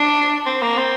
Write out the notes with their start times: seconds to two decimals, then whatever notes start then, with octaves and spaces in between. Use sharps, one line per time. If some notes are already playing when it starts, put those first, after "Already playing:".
Already playing: D4
0.46 C4
0.62 A#3
0.77 C4